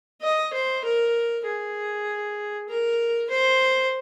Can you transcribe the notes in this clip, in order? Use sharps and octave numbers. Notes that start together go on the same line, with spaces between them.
D#5
C5
A#4
G#4
A#4
C5